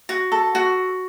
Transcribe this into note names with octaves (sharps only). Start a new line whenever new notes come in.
F#4
A4
F#4